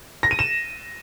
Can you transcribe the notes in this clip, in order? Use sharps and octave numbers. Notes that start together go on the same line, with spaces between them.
A#6
D#7
E7